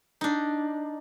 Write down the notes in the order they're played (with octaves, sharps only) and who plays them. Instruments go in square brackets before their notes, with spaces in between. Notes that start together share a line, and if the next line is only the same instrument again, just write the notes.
[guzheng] D4 D#4